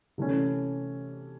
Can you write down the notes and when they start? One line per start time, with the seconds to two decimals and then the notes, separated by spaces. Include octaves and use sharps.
0.18 C3 E3 A3 C#4